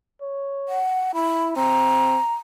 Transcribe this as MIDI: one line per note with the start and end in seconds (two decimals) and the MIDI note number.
0.22 0.82 73
0.68 1.12 78
1.15 1.52 64
1.15 1.45 83
1.56 2.19 60
1.56 2.33 82